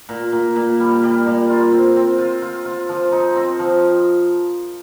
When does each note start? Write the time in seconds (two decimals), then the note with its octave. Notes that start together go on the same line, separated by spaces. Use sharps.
0.09 A#2
0.32 A#2
0.56 A#2
0.80 G3
1.03 G3
1.26 A#2
1.50 F4
1.72 C4
1.96 C4
2.18 F4
2.42 F4
2.65 F4
2.89 F3
3.12 D#4
3.36 C4
3.59 F3